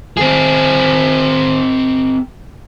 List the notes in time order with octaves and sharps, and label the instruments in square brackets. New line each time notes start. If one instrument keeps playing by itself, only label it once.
[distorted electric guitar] C4 G#4